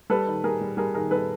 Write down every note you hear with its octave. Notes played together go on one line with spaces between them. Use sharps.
G3 A4 B4
D#3
G3 G#4 A#4
G3
G3 G#4 A#4
D#3 G#4 A#4
G3 A4 B4